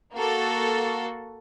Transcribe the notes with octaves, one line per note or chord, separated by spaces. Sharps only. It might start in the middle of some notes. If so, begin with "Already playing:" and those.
A#3 F#4 A4